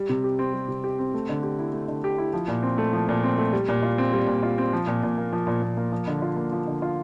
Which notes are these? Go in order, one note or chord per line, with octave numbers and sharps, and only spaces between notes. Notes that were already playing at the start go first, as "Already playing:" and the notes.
Already playing: G3
C3
G4
C4
G3
C3
G4
C4
A3
D3
G4
E4
A3
D3
G4
E4
F3
A#2
C4
A3
F3
A#2
C4
A3
G3
A#2
F4
C4
G3
A#2
F4
C4
F3
A#2
A#2
A#3
F3
A#2
A#2
A#3
F3
D3
F4
A#3
F3
D3
F4